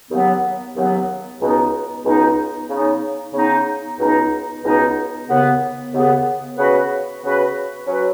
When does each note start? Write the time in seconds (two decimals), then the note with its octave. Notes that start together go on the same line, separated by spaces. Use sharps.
0.11 D#2 C#3 F#3 B3
0.76 D#2 C#3 F#3 B3
1.40 C#2 B2 B3 D#4
2.05 C#2 B2 B3 D#4
2.69 C#3 B3 D#4
3.34 C#3 B3 D#4
3.99 C#2 B2 B3 D#4
4.63 C#2 B2 B3 D#4
5.28 D#2 C#3 B3
5.92 D#2 C#3 B3
6.56 C#3 B3 F#4 B4
7.22 C#3 B3 F#4 B4
7.86 F#3 C#4 F#4 B4